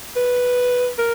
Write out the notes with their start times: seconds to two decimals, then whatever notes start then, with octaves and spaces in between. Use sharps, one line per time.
0.16 B4
0.98 A#4